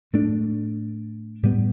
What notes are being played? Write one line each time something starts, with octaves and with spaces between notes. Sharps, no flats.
A2 A3 D4
A2 G3 B3